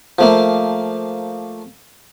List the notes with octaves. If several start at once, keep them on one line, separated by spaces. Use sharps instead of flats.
F3 A3 A#3